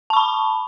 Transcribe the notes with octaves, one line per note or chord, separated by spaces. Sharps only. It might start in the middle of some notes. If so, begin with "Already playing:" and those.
A5 B5 C#6